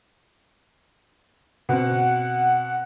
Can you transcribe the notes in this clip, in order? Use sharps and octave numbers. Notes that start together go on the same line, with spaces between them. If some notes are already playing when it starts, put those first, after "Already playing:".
B2 C4 F#5